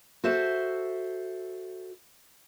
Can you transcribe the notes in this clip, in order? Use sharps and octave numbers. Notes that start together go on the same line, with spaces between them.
F#4 A4 C5 E5